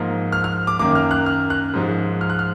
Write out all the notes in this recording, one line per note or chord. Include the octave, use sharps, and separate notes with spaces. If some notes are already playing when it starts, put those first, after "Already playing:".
Already playing: G#2 F3 A#3
F6
F6
D6
F#2 D#3 A#3 D6
F6
F#6
F6
F#6
G#2 F3 G#3
F6
F#6
F6